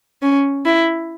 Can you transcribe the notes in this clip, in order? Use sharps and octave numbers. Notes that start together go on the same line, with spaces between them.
C#4
E4